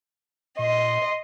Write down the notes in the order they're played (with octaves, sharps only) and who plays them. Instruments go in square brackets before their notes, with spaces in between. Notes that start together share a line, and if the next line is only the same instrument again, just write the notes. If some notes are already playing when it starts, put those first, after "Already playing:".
[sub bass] A#2 [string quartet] D#5 [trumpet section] C6